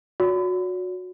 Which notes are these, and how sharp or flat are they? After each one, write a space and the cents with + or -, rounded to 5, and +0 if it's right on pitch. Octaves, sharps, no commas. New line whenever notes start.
F#4 -20 C#5 +45